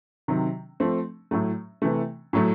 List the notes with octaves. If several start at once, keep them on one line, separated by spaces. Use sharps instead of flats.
C3 D#3 F#3
F3 A3 C4
A2 F#3 A3
C3 E3 A3
A2 F#3 A3